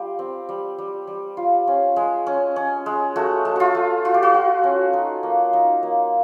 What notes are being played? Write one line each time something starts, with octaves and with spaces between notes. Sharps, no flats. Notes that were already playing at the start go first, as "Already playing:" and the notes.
Already playing: G3 F4 G4
C4
G3
G3
G3
F4
C#4
G#3
C#4
C#4
G#3
A3 F#4
A3
F4 F#4
A3
F4 F#4
G4
F#4
F4
C#4
D#4
A#3
D#4
A#3